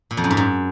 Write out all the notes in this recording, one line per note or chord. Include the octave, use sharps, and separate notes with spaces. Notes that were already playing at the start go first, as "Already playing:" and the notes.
A#2
F2
F#2
G#2
F#2